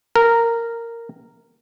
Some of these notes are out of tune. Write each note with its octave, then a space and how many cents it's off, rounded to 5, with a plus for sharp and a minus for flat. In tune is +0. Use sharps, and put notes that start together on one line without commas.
A#4 -10